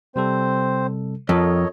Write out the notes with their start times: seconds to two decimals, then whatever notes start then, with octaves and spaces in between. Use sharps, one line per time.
0.16 C3 G3 C4 A4 C5
1.29 F2 A4 A#4 C#5 D#5